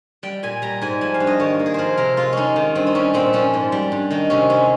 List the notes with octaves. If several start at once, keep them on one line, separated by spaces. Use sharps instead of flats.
G3 G5
A#2 G#5
G3 A#5
G#2 G#5
F3 G#5
F5
G2
D#5
D#3 C#5
A#3
G#4
F3 A#4 C5
C3 A#4
G#3 F4
G#3 C#4 D#4
D#3
G2 C4
D#4
G3 C#4
A#2 C4
F3 C#4
G#2
G3
G2
D#3 D#4
C3 C#4
G#3 C#4